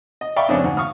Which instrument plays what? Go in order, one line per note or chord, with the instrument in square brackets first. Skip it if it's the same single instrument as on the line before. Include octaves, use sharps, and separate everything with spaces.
[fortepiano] D#5
D5 E5 F5 G5 B5 C#6
F2 G#2 C#3 B3 C#4 D4
D2 G#2
F5 C#6 D#6 F6